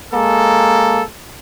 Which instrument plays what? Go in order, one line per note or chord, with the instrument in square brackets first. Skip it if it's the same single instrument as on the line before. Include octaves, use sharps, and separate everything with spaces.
[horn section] G#3 A#3 A4